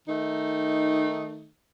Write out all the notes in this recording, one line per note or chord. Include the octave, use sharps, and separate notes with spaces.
D#3 A3 D#4